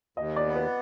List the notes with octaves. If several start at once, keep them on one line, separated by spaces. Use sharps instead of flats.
D#2 D#5
D5
B3
B4